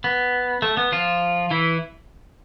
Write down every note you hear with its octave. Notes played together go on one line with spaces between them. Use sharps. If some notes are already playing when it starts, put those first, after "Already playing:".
B3
A3
B3
F3 F4
E3 E4